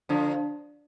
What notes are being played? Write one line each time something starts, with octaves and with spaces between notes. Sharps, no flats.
D3 F3 D4